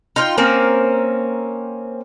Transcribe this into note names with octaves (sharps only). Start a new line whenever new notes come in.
D#4 F4 G5
A#3 C4 C#4 A#4